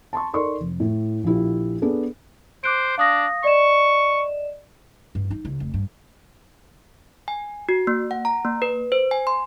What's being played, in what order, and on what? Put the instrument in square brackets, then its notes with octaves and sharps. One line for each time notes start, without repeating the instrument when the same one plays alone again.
[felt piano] A5 C6 C#6
D#4 A4 A#4 D5 C6 C#6
F1
A2 A3
A#1 A#2 E4 G4
B3 D4 G#4 A4
[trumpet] C5 [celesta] D6 F#6 D7
[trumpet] D4 [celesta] F5 D#6 A#6
[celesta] D5 D#5 E7 [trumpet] C#6
[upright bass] G2
D#4
C#2
F1
G2
[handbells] G#5
F#4
A#3
F#5
A#5
A#3
B4
C5
G#5
C6